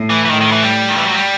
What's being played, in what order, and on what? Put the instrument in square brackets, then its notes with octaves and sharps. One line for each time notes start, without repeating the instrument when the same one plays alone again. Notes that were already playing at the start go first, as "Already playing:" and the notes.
Already playing: [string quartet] A2
[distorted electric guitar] E3
E3
[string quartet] A2 [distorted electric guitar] D#3
[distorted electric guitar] D#3
E3
G3
D#3
E3
F#3
G3